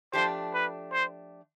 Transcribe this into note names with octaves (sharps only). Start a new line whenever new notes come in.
F3 A3 D4 G4 C5
B4
C5